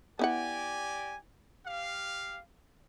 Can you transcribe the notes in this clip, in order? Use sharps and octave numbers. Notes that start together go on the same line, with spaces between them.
B3 E4 G4 D5 F#5 G#5
G4 F5